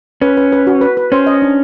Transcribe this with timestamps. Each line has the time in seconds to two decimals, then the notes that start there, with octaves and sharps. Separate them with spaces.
0.21 C#4 B4
0.37 B4
0.52 B4
0.67 F#4
0.81 B4
0.97 B4
1.12 C#4 C5
1.27 D#5
1.42 D4